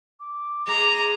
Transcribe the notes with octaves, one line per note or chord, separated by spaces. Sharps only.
D6
G#3 A#5